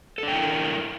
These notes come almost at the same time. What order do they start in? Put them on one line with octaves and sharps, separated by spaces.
A4 D4 G5 E4 A#4